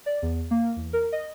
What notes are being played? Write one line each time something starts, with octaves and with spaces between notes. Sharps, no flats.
D5
E2
A#3
E2
A#4
D#5